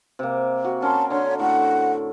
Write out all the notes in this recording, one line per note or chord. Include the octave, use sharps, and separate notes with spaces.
C3 A#3
F#4
C#4 A#4 A5 C6
D3 C#5 A#5 C6
A2 F#5